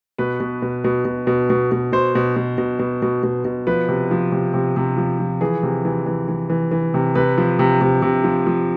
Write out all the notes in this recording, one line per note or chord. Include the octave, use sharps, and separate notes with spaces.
B2 B4
B2
B2
B2
B2
B2
B2
B2
B2 C5
B2
B2
B2
B2
B2
B2
B2
F3 B4
C3
F3
C3
C3
C3
F3
F3
E3 G#4
C3
E3
E3
E3
E3
E3
C3
C3 B4
F3
C3
C3
C3
F3
F3